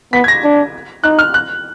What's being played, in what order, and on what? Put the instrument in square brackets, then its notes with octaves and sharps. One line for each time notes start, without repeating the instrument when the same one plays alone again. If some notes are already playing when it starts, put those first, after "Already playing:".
[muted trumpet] B3 [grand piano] B6
[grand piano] G#6
A#6
[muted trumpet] D4
[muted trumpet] D#4 [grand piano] F#6
[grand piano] F6
F#6